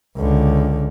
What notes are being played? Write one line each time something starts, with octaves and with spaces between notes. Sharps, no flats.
C#2 D3